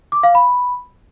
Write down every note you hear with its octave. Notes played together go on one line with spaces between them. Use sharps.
D6
F5
B5